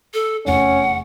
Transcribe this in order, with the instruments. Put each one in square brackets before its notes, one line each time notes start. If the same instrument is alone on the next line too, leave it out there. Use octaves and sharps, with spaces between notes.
[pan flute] A4
[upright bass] F1 E2 [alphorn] C#4 [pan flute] F#5